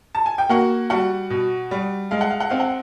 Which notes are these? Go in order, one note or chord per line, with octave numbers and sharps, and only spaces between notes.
A5
G#5
G5
A#3 F#4 F#5
G3 F#4 F#5
B2
G3
G#3 F5
F#5
F5
F#5
C4 F5
F#5